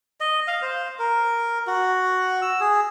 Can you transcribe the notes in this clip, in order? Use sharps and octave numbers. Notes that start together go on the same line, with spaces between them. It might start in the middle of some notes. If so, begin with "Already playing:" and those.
D#5
F5
C5
A#4
F#4
E6
G#4